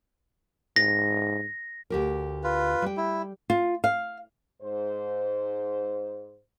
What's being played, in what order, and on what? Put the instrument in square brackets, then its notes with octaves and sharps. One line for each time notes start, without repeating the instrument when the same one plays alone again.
[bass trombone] G#2 [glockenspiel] A#6
[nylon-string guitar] D2 G4 A#4
[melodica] F4 B4
[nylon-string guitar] G3 G5
[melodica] E4
[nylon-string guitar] F4
F5
[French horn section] G#2 C5